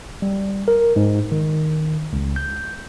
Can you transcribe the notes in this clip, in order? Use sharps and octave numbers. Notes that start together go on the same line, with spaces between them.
G3
A#4
G#2
D#3
C#2
G6